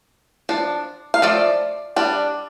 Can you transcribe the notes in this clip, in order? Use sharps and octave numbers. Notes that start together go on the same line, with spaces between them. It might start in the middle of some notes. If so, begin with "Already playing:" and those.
F3 D4
F5
F3 A3 D5
G3 D4